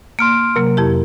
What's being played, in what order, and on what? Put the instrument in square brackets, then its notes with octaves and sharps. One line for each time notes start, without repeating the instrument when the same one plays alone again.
[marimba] A#3 [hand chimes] C6 F6 D7
[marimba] C3 F#3 A#3 [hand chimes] A#4
[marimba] F2 E4 G4